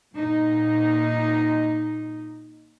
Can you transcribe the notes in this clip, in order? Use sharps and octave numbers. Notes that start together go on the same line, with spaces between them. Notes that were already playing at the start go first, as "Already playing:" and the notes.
A#2 D#4